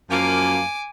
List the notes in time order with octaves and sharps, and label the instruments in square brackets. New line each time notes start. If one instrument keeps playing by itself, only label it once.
[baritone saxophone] F#2 [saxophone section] F3 A#3 [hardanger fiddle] G#5 D6